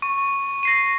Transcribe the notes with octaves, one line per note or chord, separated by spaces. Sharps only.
C#6
A#6 C7 D#7